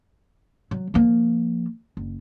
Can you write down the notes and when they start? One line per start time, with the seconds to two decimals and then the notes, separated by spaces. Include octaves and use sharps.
0.71 F#3
0.94 F3 A#3
1.97 F#1